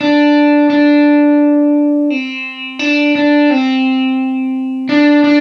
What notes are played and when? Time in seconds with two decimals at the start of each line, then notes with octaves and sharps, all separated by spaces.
0.01 D4
0.70 D4
2.10 C4
2.79 D4
3.15 D4
3.50 C4
4.89 D4
5.24 D4